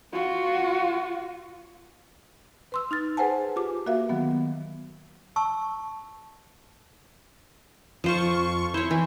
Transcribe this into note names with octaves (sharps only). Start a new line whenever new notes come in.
F4 F#4
B4 C6 E6
D#4 F6 A6
G#4 B4 C5 F#5 G#5 A5
F4 G4 D6
A#3 F#4 A#4 E5 F5
D#3 F#3 B3
A5 C#6 E6
F2 F3 F4 C5 C#6
E4 C5 C#5
E3